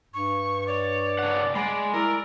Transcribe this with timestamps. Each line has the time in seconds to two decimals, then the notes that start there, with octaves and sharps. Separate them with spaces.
0.14 G2 C#6
0.67 C#5 D5
1.19 C#3 F#5
1.55 G#3 D5 B5
1.94 E4 A#4 D5 A#5